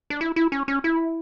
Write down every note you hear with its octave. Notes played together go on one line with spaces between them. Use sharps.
D4
E4
E4
C#4
C#4
E4